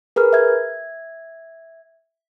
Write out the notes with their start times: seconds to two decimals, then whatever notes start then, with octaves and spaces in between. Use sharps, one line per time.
0.16 G#4 A#4 B4 F6
0.33 E5 G#6